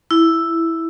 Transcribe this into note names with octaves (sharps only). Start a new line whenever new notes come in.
E4